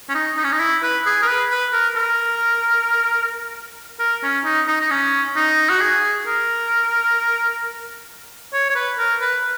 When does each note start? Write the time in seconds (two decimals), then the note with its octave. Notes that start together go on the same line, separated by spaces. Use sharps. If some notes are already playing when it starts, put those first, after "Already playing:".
0.09 C#4
0.15 D#4
0.37 D#4
0.44 C#4
0.53 D#4
0.60 E4
0.83 B4
1.06 G#4
1.23 A#4
1.28 B4
1.50 B4
1.73 A#4
1.96 A#4
4.00 A#4
4.23 C#4
4.45 D#4
4.68 D#4
4.81 D#4
4.91 C#4
5.36 D#4
5.70 F#4
5.81 G#4
6.27 A#4
8.53 C#5
8.70 C#5
8.75 B4
8.99 A#4
9.21 B4